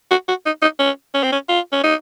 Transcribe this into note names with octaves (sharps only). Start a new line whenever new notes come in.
F#4
F#4
D#4
D#4
C#4
C#4
C4
C#4
F4
C#4
D#4